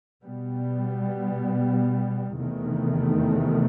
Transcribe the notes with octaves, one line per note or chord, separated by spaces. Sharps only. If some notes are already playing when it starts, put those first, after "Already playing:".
B2 G3 B3
E2 C3 D#3 A3